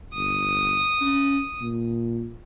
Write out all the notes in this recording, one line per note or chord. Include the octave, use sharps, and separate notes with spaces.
G1 D#6
C#4
A#2